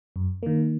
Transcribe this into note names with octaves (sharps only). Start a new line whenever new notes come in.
F#2
D#3 A#3